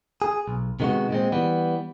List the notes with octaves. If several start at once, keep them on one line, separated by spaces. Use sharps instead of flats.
G#4
B1
C3 D#3 G#3 B3 F#4
A#2 G#3 C4
E3 G3 B3